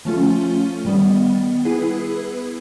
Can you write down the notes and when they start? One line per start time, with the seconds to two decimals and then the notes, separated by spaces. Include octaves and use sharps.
0.05 F3 A3 C#4 F4 A4
0.85 D#3 G3 B3
1.65 B3 E4 G#4 B4